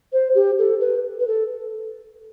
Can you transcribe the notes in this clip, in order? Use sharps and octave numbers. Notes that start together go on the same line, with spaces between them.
C5
G4
A4
B4
B4
A4